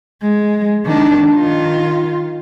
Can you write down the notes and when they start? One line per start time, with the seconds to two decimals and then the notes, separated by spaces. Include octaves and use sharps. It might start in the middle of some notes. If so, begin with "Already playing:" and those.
0.21 G#3
0.85 D#3 D4
1.32 D#3 F4